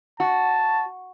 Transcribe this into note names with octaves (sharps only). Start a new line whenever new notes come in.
F#4 A5